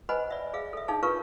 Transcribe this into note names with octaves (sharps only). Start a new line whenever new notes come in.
B4 C5 D#5 F#5 G#5 B5
D5 E5
G#4 E5 F5
A4 E5
D4 D#4 G#4 C#5 F5 A5
F4 A#4 B4 C#5 F5 C#6